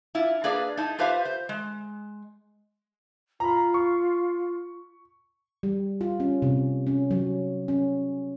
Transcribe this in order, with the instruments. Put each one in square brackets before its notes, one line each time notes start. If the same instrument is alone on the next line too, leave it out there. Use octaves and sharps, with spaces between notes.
[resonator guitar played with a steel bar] E4 F4
A#3 D4 G#4 B4 D5 F5
D#4 E4 A5
F4 G4 B4 C5 E5 F5
C5
G#3
[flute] F4 [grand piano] A#5 B5
[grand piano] C#6
[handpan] G3
F4
C#4
C3
C#4
F#3
C#4